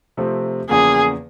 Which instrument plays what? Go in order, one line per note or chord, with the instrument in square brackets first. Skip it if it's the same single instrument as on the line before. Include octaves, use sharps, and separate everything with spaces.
[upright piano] C3 F3 A3 C4
[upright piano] E2 C#3 F3 A#3 [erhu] G#4